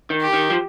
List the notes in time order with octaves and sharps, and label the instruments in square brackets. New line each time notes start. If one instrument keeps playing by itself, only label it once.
[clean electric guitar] D#3
[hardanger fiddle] G4
[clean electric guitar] D#3
F3